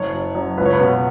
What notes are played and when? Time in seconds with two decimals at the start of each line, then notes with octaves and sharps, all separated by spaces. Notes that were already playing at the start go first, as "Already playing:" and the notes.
Already playing: F#1 C#5
0.13 F#2
0.35 F#2
0.58 C#2 B4
0.66 C#5
0.73 B4
0.81 B2